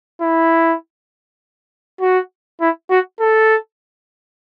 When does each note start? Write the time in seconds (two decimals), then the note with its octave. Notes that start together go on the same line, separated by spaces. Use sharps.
0.21 E4
2.01 F#4
2.60 E4
2.90 F#4
3.20 A4